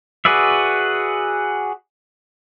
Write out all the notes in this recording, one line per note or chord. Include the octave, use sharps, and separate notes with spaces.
F#4 G#4 B4 D5 E5